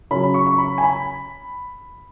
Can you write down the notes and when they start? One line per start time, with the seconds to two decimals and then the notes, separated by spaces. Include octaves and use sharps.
0.11 C#3 F#3 C#4 B5
0.23 B5
0.34 C#6
0.47 C#6
0.58 B5
0.78 G#5
0.83 B5